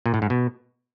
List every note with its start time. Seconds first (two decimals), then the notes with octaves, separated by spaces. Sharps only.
0.06 A#2
0.14 A2
0.22 G#2
0.30 B2